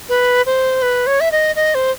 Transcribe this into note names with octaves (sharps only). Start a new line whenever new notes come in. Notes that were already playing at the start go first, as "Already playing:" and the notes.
B4
C5
B4
C#5
E5
D#5
D#5
C5